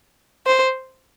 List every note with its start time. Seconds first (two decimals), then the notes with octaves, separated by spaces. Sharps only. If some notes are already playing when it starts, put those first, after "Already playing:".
0.46 C5